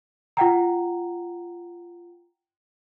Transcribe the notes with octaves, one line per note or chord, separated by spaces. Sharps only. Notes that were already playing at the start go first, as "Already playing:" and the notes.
F4 F#5 G5 A#5